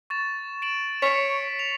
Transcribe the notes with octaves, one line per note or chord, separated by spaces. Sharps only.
C#6 A6 E7
D7 E7 F#7
C#5 B6 C#7
F7